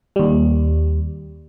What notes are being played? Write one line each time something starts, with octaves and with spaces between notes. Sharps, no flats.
D#2 G3